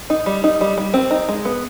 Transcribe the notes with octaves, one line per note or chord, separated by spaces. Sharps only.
D#4
G3
D#4
G3
G3
C4
D#4
G#3
B3